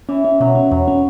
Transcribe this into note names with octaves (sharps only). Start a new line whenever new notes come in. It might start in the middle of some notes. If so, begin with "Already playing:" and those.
E3 C#4
C#4
B2 F#3
C#4
E2 F#3
C#4